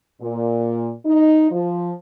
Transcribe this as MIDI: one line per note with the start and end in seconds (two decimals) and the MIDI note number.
0.21 0.92 46
1.06 1.50 63
1.51 1.92 53